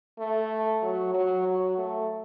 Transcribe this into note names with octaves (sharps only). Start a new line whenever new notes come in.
A3
F#3
F#3
F#3
A3